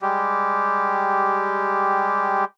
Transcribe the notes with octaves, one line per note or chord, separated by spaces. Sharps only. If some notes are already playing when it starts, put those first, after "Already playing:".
G3 G#3 G4